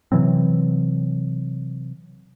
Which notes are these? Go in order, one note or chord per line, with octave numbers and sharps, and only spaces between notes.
C3 E3 F#3 C4